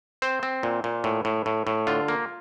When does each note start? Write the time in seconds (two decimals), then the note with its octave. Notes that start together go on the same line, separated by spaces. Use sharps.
0.22 C4 C5
0.43 C4
0.63 A#2
0.84 A#2
1.04 A2
1.25 A2
1.46 A2
1.67 A2
1.87 D3 F4
2.08 A#3